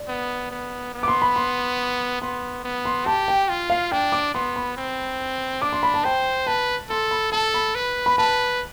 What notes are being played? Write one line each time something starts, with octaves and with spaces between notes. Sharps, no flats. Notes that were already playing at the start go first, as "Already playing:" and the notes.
Already playing: D5
B3
B3
B3
D6
C6
B5
C6
B3 C6
B3
C6
G4 A5
G5
F4
F5
D4 G5
D6
B3 C6
B5
C4
D4 D6
C6
B5
A5
C5 G5
B4 A5
A4 C6
B5
A4 A5
B5
B4
B5
B4 A5